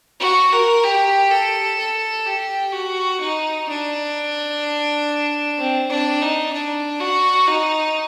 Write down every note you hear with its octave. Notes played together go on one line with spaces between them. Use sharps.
F#4
A#4
G4
A4
A4
G4
F#4
D#4
D4
C4
D4
D#4
D4
F#4
D#4